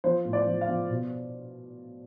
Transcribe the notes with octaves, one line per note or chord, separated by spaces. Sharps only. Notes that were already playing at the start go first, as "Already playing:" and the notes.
F3 C5
A2
D5
F3
F5
F3
B2